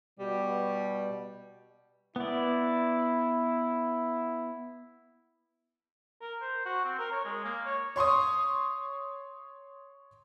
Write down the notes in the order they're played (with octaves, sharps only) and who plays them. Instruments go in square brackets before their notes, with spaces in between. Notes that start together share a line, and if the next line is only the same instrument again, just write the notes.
[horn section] B2 G3
[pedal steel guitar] B3 D5 [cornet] E4
[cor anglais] A#4
C5
F#4
C4
A#4
C#5
G#3
A#3
C#5
[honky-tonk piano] C#5 C6 C#6 D#6